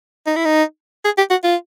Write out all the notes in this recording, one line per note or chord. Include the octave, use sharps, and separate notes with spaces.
D#4
E4
D#4
G#4
G4
F#4
F4